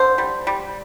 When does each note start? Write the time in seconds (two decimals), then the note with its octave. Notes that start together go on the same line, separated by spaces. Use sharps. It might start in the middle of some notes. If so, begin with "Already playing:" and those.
Already playing: D3 C5
0.18 G3
0.47 G3